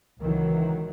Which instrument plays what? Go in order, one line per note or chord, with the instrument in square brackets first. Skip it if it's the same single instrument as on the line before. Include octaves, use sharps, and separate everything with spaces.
[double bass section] C#2 D#3 E3 F#3